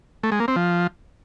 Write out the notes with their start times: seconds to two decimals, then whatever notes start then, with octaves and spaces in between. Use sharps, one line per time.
0.23 A3
0.32 G#3
0.40 A#3
0.48 C4
0.56 F3